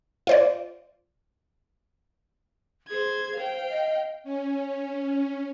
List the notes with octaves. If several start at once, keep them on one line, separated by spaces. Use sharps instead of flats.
F4 C5 D5
G#4 C5 G#6
C5 F5 G5
D#5
C#4